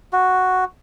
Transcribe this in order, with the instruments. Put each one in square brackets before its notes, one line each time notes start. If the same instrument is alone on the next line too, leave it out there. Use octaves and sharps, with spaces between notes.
[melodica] F#4